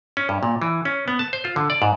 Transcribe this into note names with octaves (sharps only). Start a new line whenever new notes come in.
C#4
G2
A#2
E3
C#4
B3
A5
C5
F4
D3
D5
G#2